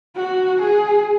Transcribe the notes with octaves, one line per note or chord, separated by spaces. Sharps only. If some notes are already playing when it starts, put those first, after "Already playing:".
F#4
G#4